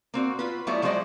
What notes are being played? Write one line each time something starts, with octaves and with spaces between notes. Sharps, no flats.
A#3 C4 F#4
F4 B4
F#3 G3 A3 B3 E4 F4
F3 F#3 G#3 C5 D5 D#5